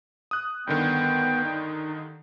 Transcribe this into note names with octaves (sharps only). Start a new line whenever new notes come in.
D#6 F#6
G2 D3 D#3 B3 G5
D#4